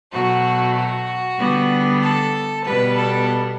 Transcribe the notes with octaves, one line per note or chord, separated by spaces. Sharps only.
B2 F#3 A3 F#4
F#4
D3 G3 B3
A4
B2 G3 B3 B4
A4